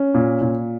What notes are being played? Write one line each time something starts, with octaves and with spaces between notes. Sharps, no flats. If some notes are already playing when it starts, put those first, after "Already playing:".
Already playing: C#4
A#2
A#2